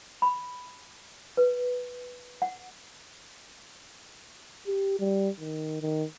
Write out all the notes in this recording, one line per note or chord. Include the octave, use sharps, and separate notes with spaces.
B5
B4
F#5
G4
G3
D#3
D#3